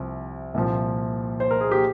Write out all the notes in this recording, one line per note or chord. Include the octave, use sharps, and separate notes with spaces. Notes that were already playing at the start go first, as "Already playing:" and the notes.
Already playing: C2 C3 F3
C2 A#2 F3
C5
A#4
G#4
G4